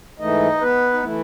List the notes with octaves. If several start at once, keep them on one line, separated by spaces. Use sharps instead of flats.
G#2 E3 A3 D#4 D#5
B3 B4
D#4
E3 A3 E4